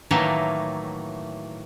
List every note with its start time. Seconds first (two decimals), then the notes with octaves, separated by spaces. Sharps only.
0.11 A2 D#3 E3 F#3 A3 A#3